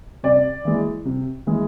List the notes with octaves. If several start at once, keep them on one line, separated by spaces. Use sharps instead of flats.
C3 D5
E3 G#3
C3
E3 G#3